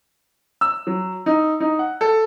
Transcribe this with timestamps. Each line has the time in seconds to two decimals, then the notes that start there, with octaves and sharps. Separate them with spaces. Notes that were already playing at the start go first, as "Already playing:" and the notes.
0.61 E6
0.87 F#3
1.26 D#4
1.60 D#4
1.79 F#5
2.01 A4